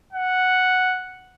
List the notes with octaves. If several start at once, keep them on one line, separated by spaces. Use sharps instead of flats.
F#5